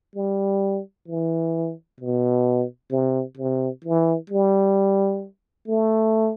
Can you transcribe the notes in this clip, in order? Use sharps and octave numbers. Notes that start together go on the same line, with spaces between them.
G3
E3
B2
C3
C3
E3
G3
A3